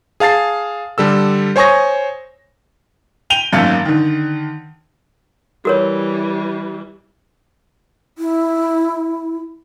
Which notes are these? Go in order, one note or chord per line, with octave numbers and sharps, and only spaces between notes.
G#4 F5 A5 A6 C7
D3 G3 A4 E6
C5 C#5 G#5 C#6 D#6 A#6
G5 D#7 F7 G7
G#1 F#2 A3 A#3 A6 C#7
D3 D#3
E3 G3 F#4 A#4 C#5
E4